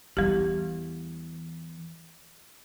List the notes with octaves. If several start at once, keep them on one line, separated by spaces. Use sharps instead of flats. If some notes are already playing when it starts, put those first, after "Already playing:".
E2 E3 G3 G4